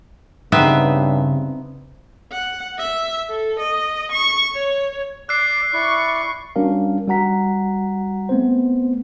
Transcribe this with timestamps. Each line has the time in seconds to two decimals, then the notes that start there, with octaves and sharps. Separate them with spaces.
0.52 G2 C#3 B3 C4 D#4 B4 E5
2.32 F#5
2.79 E5
3.29 A4
3.59 D#5
4.12 C#6
4.53 C#5
5.29 D5 D6 E6 F#6 C7
5.73 E4 D5 C#6
6.56 G3 C#4 D4 F#4 A#4 F5
7.08 G3 F#4 F#5 A#5 B6
8.29 A3 B3 C4 C5